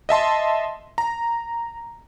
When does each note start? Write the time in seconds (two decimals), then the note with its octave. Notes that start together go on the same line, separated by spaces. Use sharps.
0.09 D#5 E5 A5 C6
0.98 A#5